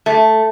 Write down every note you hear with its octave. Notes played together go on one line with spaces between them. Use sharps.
A3